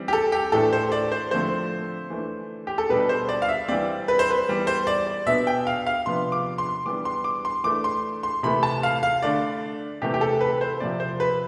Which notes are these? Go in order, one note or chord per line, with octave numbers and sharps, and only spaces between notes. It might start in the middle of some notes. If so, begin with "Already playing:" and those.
Already playing: E3 G3 C4
G4
A4
G4
A2 E3 A3 D4 A4
C5
D5
C5
D3 F3 A3 C4 C5
E3 A3 D4
G4
A4
B2 G3 D4 B4
B4
C5
D5
F5
E5
E3 G3 C4 D5
B4
C5
B4
E3 G3 B3
C5
D5
D5
B2 B3 D4 E5
G5
F5
F5
C3 F3 B3 D4 C6
D6
C6
E3 G3 B3 D4 D6
C6
D6
C6
E3 A3 D4 D6
C6
C6
C3 E3 A3 B5
A5
F5
F5
D3 A3 D4 D5
C3 E3 A3 C4 G4
G4
A4
B4
C5
C3 F3 C4 D5
C5
B4